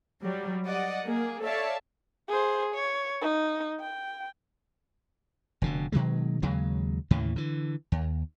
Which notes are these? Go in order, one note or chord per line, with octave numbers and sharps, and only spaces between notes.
F#3 G3
D5 D#5 F#5
A#3 G#4
A4 C#5 D5 E5 F5 A5
G#4 C5
C#5
D#4
G5
F1 B2 D3
B2 D#3 F#3 G#3
D#2 C#3 F#3 G#3
D#2 A2 C#3 E3
D3 E3
D#2